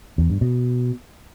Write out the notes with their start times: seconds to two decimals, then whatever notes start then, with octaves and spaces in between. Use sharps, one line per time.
0.18 E2
0.30 G2
0.41 B2